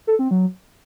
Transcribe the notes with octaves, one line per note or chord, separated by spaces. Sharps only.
A4
C4
F#3